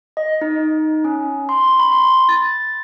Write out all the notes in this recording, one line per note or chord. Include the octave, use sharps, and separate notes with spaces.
D#5
D#4
C#4
C6
B5
C6
A6